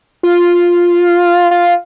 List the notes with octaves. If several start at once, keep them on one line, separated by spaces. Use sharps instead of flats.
F4
F4